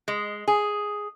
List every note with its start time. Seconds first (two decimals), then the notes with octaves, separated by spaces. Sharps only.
0.08 G#3
0.48 G#4